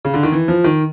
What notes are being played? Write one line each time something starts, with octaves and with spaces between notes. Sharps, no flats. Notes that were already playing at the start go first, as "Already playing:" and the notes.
C#3
D3
D#3
E3
F3
D#3